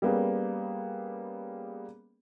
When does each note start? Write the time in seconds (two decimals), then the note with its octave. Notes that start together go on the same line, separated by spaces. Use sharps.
0.02 G3 A#3 B3 C#4 G#4